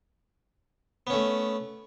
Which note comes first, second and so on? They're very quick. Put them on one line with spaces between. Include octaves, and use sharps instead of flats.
B3 C#4 A3